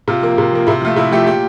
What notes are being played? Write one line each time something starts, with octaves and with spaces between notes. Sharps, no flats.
C3 F4
F3 A#3
C3
F3 A#3
C3 E4
F3 A3 F4
C3 E4
F3 A3 G4
A#2 G4